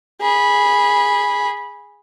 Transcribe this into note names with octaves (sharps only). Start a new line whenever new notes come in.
G#4 B5